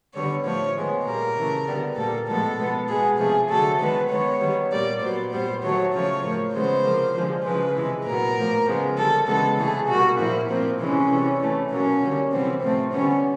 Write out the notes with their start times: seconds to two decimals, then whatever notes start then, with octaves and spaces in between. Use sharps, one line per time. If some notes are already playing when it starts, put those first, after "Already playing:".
0.14 D3 G3 B3 C#5
0.45 A2 F3 A3 C#5
0.76 D#3 G#3 B3
1.05 A#2 G3 A#3 A#4
1.36 C#3 E3 A3
1.67 D3 G3 B3
1.97 A#2 G3 A#3 A4
2.28 A2 F3 G#3 B3 A4
2.58 B2 G#3 B3
2.88 B2 G#3 B3 G#4
3.18 C3 F3 A3 G#4
3.50 D3 F#3 A3 A4
3.80 D#3 G#3 B3 B4
4.10 D#3 G#3 B3 C#5
4.41 D#3 G3 B3
4.71 A#2 G3 A#3 D5
5.01 A#2 F#3 B3 C5
5.32 A#2 G3 B3 C5
5.63 D#3 F#3 A3 C#5
5.93 C#3 F3 A3 C#5
6.23 A2 F3 A#3
6.54 C#3 E3 G#3 B3 C5
6.84 C3 F3 A#3
7.15 D3 F3 G#3
7.45 C#3 F3 G#3 B4
7.76 C3 E3 G#3
8.06 A#2 F#3 B3 A#4
8.37 A2 F3 A#3
8.66 C#3 F3 G#3 B3
8.97 D3 G3 A#3 A4
9.27 C#3 E3 G#3 B3 A4
9.58 C3 E3 A3 G#4
9.88 B2 G3 A#3 F#4
10.19 A#2 F3 A#3 E4
10.49 A#2 F3 A#3 C4
10.80 C3 E3 G#3 C#4
11.10 C3 E3 G3
11.40 C3 E3 A3
11.71 B2 F#3 A#3 C#4
12.02 D3 G3 A#3
12.32 C3 E3 G3 B3 C4
12.62 A2 F3 A3 C4
12.92 D3 G3 B3 C#4